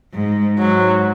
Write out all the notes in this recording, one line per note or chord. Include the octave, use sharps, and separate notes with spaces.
G#2
G#2 F#3